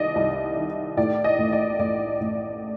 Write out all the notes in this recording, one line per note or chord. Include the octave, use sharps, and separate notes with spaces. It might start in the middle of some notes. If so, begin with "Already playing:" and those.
Already playing: C2 D#3 D5 D#5
C2
D#3
A2 D5
D#5
A1
D5
A1 D5
A1